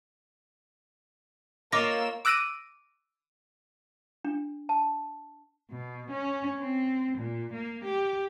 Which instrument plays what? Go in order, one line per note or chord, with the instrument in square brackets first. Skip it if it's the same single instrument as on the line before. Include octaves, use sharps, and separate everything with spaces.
[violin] A#3 E6 [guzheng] F4 A#4 C#5 [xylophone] D#5 D6 A#6
[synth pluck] D6 E6 F#6 A#6 D7 D#7
[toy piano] D4
A5
[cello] B2
C#4
C4
A#2
A#3
G4